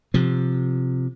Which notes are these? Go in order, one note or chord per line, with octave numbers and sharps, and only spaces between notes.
C3 F3